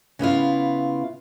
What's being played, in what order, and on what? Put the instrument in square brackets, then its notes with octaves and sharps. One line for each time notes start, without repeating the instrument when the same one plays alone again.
[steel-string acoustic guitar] C#3 B3 E4 F4